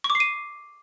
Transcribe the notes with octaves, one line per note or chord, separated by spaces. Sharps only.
C#6
D6
C7
D#7